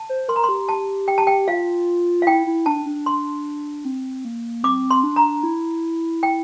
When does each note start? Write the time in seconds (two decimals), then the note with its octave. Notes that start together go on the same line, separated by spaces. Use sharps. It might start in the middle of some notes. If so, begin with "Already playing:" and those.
Already playing: A5
0.09 C5
0.29 A#4 C6
0.36 A#5
0.44 C6
0.49 G4
0.69 A5
1.08 G5
1.18 A5
1.27 G5
1.48 F4 F5
2.22 F5
2.27 E4 G5
2.47 E4
2.66 D4 A5
2.86 D4
3.06 C6
3.85 C4
4.25 A#3
4.63 C4 D6
4.91 C6
5.03 D4
5.16 A#5
5.43 E4
6.23 G5